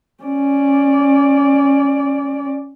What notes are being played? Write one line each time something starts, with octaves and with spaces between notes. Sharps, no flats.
C#4 D5